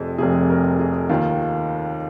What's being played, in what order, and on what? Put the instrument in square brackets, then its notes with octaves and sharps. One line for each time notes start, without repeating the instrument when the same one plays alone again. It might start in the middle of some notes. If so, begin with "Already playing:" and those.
Already playing: [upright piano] F1 F2 C3 G#4
F1 F2 C3 G#4
A#4
G#4
D#2 D#3 F4